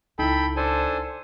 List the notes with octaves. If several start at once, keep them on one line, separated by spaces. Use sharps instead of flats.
C#2 D#4 E4 A4 G5 B5
D4 A4 C5 G#5